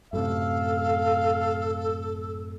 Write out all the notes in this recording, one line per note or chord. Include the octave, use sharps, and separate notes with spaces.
F#2 A2 C3 A4 F5